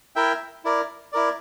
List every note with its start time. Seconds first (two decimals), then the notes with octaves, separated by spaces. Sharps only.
0.16 E4 A#4 E5 G5
0.64 E4 A#4 D5
1.12 E4 A#4 D5